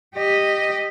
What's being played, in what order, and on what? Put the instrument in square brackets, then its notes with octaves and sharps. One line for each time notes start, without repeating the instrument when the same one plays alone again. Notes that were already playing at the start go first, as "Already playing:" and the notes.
[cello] G4 D#5